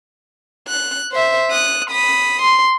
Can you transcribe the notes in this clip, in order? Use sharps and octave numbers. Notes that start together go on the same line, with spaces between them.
F#6
C5 E5
D#6 F#6
B5 D#6
C6